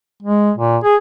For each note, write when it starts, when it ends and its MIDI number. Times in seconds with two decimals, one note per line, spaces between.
0.22 0.51 56
0.58 0.78 46
0.84 0.96 68